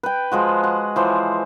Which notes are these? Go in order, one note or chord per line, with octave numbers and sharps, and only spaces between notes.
B4 G5
F3 G#3 F#4
F#5
E3 F3 C5 C#5